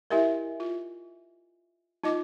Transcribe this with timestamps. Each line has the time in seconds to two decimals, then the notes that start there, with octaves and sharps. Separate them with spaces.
0.10 E4 G4 A#4 D#5 E5 G#5
0.60 F4
2.04 D#4 F4 D#5 D6